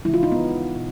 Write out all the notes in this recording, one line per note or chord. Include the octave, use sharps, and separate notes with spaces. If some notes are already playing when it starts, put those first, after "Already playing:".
C#3 E3 G#3 E4
F4
D#4
B3
B2